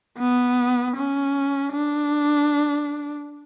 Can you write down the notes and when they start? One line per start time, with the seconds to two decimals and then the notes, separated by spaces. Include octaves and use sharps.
0.18 B3
0.97 C#4
1.73 D4